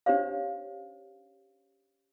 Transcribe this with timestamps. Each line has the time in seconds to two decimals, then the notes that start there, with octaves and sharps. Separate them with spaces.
0.06 C#4 D4 G4 C5 C#5 F5